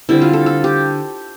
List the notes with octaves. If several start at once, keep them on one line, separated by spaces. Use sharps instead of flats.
D3 G3 C4 E4
F4
A4
A4
G4